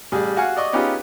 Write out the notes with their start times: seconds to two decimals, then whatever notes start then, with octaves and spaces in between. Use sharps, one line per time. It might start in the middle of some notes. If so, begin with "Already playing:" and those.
0.12 A1 G3 G#4
0.36 F#4 F5 F#5 G#5
0.56 D5 D#5 C#6 D#6
0.73 B3 C#4 D#4 F4 G4 G#4